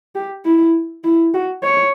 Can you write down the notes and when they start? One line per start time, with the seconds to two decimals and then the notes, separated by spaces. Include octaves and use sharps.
0.15 G4
0.45 E4
1.04 E4
1.34 F#4
1.63 C#5